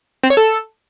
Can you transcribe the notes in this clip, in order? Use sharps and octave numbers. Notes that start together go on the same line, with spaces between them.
C4
C#5
A4